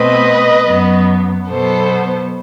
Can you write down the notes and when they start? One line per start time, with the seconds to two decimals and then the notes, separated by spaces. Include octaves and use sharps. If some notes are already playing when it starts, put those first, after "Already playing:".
Already playing: B2 A3 C4 B4 D#5
0.64 F#2 F#3 B3
1.50 B2 F#3 B3 A4 C5